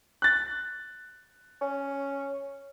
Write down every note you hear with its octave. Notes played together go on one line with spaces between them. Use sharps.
F#6 A6
C#4